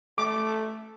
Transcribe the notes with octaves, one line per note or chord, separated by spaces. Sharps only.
A3 D6